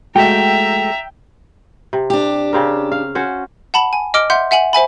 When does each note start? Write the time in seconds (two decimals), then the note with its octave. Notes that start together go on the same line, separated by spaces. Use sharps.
0.16 G#3 A3 F#4 E5 G5 A#5
1.93 C3
2.10 D4 G4
2.53 C#3 C4 A#4
2.92 F5
3.15 C#4 F#4 C5
3.74 F#5 A5 B5 F#7
3.93 G#5
4.14 D#5 D6 F6 D7 G7
4.30 E5 F#5 C6 G6
4.51 E5 F#5 G#5 F#7
4.73 C5 E5 G#5 B5